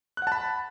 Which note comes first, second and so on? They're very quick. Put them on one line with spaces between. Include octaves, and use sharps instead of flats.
F#6 F#5 A5 B5